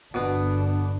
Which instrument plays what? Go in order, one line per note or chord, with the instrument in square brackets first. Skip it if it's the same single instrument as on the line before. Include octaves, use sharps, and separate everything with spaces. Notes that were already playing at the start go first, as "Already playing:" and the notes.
[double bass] G1 D4 [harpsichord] B2 B3